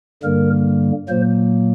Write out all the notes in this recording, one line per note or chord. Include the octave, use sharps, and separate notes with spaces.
G2 D3 G3 A#3 A#4
A#2 F#3 A#3 C5